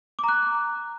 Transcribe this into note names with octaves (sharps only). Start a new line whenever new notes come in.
A#5 D6 F#6